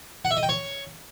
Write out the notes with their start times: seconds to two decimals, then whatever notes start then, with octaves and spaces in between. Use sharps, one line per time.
0.25 F#5
0.31 E5
0.37 D#5
0.43 G5
0.49 C#5